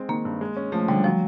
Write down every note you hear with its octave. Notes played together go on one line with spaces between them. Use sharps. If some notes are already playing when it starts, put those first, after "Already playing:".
Already playing: G#3 C4
D#3 A#3
G2
G#3
C#4
F3 A3
D3 G3
F3 F#3